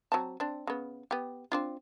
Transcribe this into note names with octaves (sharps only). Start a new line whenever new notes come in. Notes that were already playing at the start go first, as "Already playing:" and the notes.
F#3 C4 A5
C4 D4
C#3 B3
B3 G4
C4 D4 F4